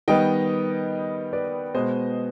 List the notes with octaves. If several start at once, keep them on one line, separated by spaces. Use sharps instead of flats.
D#3 G3 B3 D#5 G5
B4 D5
B2 G#3 B3 C5 D#5